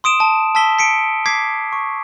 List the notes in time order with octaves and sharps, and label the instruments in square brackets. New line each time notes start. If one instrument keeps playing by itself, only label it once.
[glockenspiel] C6 D#6 D7 E7
A5
A5 E6 B6 G7
B6 C#7 D7
D6 G#6 B6 C7
C#6